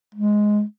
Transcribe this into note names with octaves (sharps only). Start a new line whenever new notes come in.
G#3